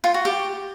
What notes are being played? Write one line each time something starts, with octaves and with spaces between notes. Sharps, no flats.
F4
F#4
G4